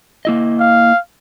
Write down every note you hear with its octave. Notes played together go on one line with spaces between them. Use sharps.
A#3 E4 D#5
F5